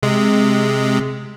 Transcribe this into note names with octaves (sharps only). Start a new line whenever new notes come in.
C3 G#3